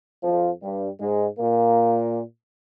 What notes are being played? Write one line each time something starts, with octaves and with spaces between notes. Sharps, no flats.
F2 F3
G2 G3
G#2 G#3
A#2 A#3